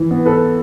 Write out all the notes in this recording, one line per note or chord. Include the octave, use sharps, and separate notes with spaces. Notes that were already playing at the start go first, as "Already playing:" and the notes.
Already playing: E3
B3
A4 B4